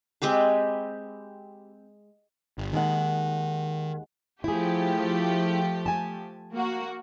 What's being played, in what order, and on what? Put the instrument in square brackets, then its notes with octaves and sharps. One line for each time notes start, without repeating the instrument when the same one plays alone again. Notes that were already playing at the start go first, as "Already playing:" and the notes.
[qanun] G#3 C4 G4 B4
[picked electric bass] G1
[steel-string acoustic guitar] D#2 G#3 F#5 [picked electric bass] D#3
[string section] F3 A3 G4 [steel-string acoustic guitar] E4 G#4
[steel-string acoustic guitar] G#5 A5
[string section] A#3 F#4